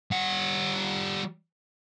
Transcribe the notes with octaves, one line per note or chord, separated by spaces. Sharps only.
G3 F#5